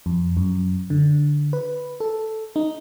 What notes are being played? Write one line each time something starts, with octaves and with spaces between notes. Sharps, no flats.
F2
F#2
D3
B4
A4
D#4